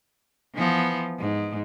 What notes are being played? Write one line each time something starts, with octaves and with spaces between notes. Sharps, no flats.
E3 F3 B3
G#2